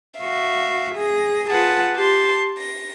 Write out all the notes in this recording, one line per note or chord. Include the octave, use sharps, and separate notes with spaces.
F#4 E5 F5
G#4 A#6
F4 G#4 B4 F#5 A5
G4 A5 C6
A#6